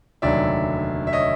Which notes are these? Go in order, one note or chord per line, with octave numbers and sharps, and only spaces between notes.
F1 D#2 D3 F#3 D5 E5
E5
C#5 D#5